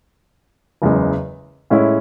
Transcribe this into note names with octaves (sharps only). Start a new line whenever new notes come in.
F#1 E2 C#3 G#3
A2 G#3 C#4 E4